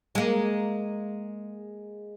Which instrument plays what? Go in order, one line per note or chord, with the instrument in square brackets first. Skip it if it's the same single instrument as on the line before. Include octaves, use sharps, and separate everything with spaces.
[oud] G#3 A#3